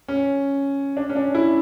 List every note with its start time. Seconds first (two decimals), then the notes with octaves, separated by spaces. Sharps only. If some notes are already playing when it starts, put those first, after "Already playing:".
0.08 C#4
0.97 D4
1.09 C#4
1.16 D4
1.35 E4